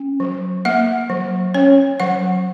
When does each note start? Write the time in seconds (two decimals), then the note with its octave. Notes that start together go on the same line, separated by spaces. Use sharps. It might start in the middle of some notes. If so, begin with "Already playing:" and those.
Already playing: C#4
0.20 F#3
0.65 A#3 F#5
1.10 F#3
1.54 C#4 C#5
2.00 F#3 F#5